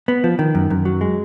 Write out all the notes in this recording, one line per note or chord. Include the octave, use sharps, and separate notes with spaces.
B3
F3
D#3
F#2
F#2
F#3
G#3